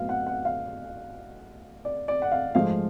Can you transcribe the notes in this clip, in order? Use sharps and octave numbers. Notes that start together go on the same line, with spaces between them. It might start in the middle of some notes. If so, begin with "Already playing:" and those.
Already playing: A2 F#3 B3 F5
F#5
F#5
F5
D5
D5
F#5
F5
G#2 F3 A3 F5